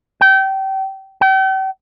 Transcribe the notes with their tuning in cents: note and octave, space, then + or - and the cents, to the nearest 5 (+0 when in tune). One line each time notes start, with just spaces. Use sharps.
G5 -25
G5 -40